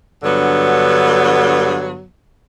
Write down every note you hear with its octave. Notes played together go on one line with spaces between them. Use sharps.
G2 D3 F#3 B3